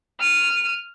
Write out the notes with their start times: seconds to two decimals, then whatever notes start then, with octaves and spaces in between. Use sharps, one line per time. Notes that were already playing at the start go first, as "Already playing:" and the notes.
0.20 F6 D#7